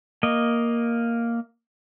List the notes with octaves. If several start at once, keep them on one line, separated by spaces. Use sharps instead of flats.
A#3 D#5